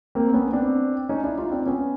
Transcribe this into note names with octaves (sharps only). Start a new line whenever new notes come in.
A#3 C4
B3 C#4
C4 D4
C#4 D#4
D4 E4
D#4 F4
C4 D4
B3 C#4